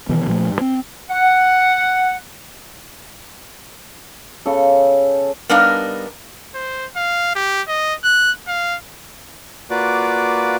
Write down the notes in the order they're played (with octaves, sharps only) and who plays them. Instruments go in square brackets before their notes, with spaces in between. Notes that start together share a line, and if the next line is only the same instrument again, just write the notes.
[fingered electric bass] B2 D#3 E3 B3
A#2 F3 A3
G2
C4
[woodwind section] F#5
[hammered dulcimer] C#3 A4
[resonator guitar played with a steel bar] G3 B3 D4 D#4 A#4 F5
[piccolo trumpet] C5
F5
G4
D#5
F#6
F5
[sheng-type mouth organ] A#3 F4 F#4 B4 D5 D6